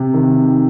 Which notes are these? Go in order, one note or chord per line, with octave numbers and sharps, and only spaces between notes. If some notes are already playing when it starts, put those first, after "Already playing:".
Already playing: C3
D#3